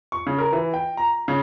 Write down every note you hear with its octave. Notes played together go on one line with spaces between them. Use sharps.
C#6
C#3
A#4
E3
G5
A#5
C#3